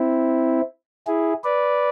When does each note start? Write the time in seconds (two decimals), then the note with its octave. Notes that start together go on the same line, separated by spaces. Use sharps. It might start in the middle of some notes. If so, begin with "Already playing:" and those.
Already playing: C4 E4
1.07 E4 G#4
1.44 B4 D5